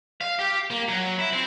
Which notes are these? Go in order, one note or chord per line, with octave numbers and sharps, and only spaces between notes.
F5
G4
A#3
F#3
E4
C4